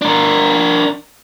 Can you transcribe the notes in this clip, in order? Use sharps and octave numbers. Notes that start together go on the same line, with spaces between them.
D4 A#4